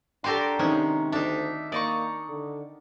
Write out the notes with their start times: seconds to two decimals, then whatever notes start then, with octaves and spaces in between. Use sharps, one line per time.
0.24 D4 F#4 G4 A4 A#4 G5 C6
0.59 C3 D#3 G#3 C#4
1.12 D2 D4 D#4 E5
1.72 A#3 D#4 D5 A#5 C#6
2.29 D3